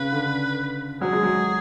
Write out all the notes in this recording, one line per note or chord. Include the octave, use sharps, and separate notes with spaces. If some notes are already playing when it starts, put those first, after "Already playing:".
Already playing: C#3 B4
D3
F#3 G#4
G#3
F#3